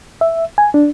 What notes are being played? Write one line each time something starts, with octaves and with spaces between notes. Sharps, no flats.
E5
G#5
D4